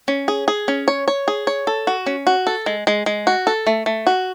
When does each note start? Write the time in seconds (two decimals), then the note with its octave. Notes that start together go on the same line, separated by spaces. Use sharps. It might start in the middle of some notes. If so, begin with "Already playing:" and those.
0.08 C#4
0.28 G#4
0.48 G#4
0.68 C#4
0.88 C#5
1.08 C#5
1.28 G#4
1.47 C#5
1.67 A4
1.87 F#4
2.06 C#4
2.27 F#4
2.47 A4
2.66 G#3
2.87 G#3
3.06 G#3
3.27 F#4
3.47 A4
3.67 A3
3.86 A3
4.07 F#4